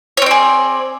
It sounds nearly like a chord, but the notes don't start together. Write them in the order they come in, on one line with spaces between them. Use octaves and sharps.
C#5 C4 D5 G#4